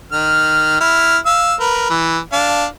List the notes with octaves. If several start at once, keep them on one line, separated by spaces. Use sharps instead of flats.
D#3 F6
E4 F6
F5 E6
A#4 B4
E3
D4 F5